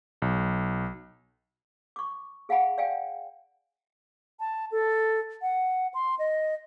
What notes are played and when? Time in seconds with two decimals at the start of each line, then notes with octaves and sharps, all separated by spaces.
0.22 B1
1.96 C#6 D6
2.49 G#4 F5 F#5 G#5 B5
2.78 D5 F5 G5 G#5
4.40 A5
4.72 A4
5.42 F#5
5.94 C6
6.19 D#5